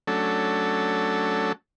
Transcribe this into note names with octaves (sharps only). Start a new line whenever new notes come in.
F#3 A3 C#4 D4 A4